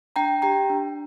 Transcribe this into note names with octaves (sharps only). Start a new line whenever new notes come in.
D4 G5 A#5
G4 G5 A#5
D4